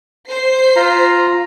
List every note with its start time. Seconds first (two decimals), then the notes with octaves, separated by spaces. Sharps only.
0.29 C5 C7
0.76 F4 A#5